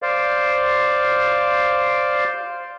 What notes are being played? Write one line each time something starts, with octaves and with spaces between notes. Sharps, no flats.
C5 D5 F5